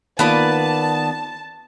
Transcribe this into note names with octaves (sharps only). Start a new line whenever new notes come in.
D#3 A#3 B3 F4 B4 D5 A5